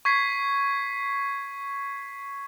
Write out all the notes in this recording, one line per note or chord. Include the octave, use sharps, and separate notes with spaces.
C#6 G#6 B6 C7